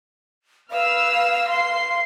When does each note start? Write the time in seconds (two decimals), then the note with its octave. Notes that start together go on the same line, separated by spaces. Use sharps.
0.71 B4 F5 E6 F6
1.49 C6 C7